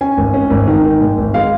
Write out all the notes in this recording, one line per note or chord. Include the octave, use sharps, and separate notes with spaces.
C#4 G#5
G#1
C#4
G#1
D#3
D#3
G#2
G#1
G#3 F5